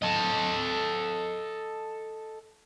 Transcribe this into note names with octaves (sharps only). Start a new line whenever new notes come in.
A4 D#5